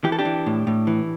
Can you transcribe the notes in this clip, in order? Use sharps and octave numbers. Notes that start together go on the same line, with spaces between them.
E3 G4
A4
D4 G4
E3
A2
A2
E3